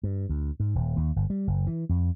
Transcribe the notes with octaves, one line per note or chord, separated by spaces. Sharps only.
G2
D2
G#2
D#1
D#2
G1
G3
F#1
E3
F2